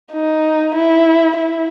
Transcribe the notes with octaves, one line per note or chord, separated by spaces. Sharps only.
D#4
E4
E4